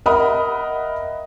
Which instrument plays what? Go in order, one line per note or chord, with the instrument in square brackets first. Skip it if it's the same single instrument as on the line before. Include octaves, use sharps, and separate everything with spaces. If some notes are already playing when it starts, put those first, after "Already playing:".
[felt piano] A#4 D#5 E5 F#5 B5 D#6